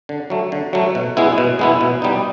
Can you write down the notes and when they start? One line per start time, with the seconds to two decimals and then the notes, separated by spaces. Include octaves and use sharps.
0.09 D3
0.30 F#3 A3
0.52 D3
0.73 F#3 A3
0.95 B2
1.17 G#3 B3 E4
1.38 B2
1.59 G#3 B3 E4
1.81 B2
2.02 G3 B3 D#4